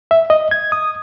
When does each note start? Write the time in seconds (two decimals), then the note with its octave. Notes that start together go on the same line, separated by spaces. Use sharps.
0.11 E5
0.30 D#5
0.51 G#6
0.72 D#6